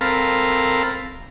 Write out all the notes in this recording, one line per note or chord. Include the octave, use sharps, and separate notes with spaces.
C4 A4 A#4 F5 B5